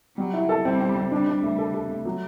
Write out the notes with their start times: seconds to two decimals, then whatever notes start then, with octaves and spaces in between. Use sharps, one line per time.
0.17 F#3 G3
0.33 E4
0.49 A4
0.65 G3 C4
0.81 C4
0.96 C4
1.12 G3 D4
1.27 D4
1.43 A3
1.58 A4
1.74 A4
1.90 A3
2.05 F#3